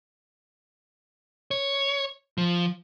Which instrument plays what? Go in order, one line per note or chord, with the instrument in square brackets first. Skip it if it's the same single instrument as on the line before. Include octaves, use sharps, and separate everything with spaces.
[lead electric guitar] C#5
F3